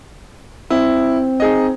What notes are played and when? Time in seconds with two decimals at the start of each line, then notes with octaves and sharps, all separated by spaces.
0.70 C4 E4
1.40 D#4 G#4 D#5